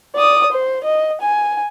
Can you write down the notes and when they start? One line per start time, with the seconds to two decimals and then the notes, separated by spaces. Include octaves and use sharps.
0.15 D5 D#6
0.52 C5
0.84 D#5
1.21 G#5